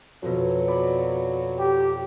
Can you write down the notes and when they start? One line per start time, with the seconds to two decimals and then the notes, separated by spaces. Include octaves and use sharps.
0.23 F2 B2 F#3
0.68 D5 B5
1.59 G4